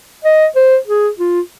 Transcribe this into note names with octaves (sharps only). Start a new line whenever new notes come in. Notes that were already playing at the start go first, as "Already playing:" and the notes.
D#5
C5
G#4
F4